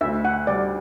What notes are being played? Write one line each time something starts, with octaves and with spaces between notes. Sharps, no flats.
D2 E5
F#5
G3 D5